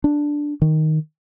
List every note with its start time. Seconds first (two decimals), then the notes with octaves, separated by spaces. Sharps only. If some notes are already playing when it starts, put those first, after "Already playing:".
0.04 D4
0.62 D#3